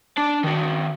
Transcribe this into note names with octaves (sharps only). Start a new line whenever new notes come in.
D4 A5
D#3 F#4